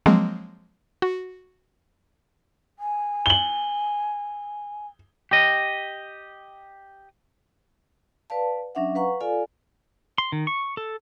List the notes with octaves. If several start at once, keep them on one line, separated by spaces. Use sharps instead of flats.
F3 F#3 G#3 A#3 C4
F#4
G#5
F#7 G7
G4 D#5
B4 D5 F5 A5
F#3 C#4 D4 E5 F#5
B4 F5 F#5 A#5 C#6
F4 A4 D5 F5 G#5
C6
D#3
C#6
A4